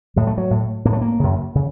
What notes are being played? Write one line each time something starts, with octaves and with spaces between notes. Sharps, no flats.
A2 F#3
A3
F#3
A2
A2 A#3
A3
A#3
F#2 C#3
C#3